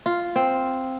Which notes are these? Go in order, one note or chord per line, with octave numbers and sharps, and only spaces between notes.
F4
C4